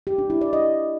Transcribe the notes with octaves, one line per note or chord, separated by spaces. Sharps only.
G4
D4
E4
D5
D#5